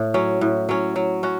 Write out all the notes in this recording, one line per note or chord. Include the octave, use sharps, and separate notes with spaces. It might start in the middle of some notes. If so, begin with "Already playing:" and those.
Already playing: A2
F#3 C#4
A2
F#3 C#4
F#3
C#4 F#4